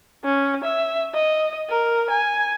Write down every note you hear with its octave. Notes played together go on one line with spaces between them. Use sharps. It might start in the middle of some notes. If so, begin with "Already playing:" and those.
C#4
E5
D#5
A#4
G#5